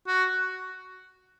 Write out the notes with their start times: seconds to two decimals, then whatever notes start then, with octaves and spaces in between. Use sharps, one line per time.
0.07 F#4